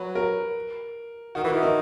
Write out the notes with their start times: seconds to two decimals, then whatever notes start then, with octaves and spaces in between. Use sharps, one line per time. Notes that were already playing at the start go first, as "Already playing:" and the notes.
Already playing: F#3 B4
0.15 A#4
1.35 D#3 F#4
1.44 E3
1.48 D#3 E4
1.63 D#4